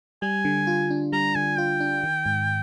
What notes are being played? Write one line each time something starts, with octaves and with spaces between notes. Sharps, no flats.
G3 G#5
D3
F4
D4
G3 A#5
D3 G#5
F4 G5
D4
D#3
G#2